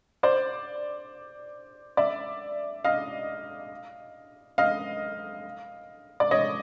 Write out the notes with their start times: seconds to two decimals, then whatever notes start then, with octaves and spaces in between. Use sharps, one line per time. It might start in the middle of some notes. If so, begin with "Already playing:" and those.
0.23 C5 D5
1.97 D5 E5
2.85 D#5 F5
4.58 D#5 F5
6.20 D5
6.31 C#5 D#5